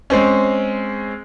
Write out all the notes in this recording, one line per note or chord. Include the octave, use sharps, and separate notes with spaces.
G#3 C4 C#4